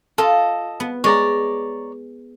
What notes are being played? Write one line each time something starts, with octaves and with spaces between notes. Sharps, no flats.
F4 A4 D#5
B3
G#3 C#5 D5 A#5